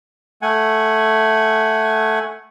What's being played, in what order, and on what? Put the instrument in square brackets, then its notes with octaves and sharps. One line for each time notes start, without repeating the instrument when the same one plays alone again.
[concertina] A3 F#5 G#5